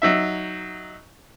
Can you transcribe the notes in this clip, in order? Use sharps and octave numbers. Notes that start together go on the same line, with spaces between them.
F#3 D#4 E5